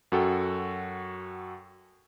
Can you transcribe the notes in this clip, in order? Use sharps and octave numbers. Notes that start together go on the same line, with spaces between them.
F#2 F#4 A4 G5